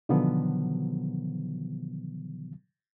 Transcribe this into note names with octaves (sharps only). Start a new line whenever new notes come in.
B2 D3 D#3 F3 F#3 B3